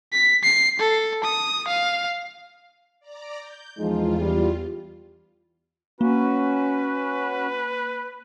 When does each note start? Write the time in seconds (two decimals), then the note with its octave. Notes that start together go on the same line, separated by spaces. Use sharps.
0.13 B6
0.44 C7
0.80 A4
1.24 D#6
1.68 F5
3.00 D5 A#5 D6
3.37 G6
3.78 E2 F3 G#3 D#4 F4
4.19 G3
6.01 A#3 C#4 F#4 B4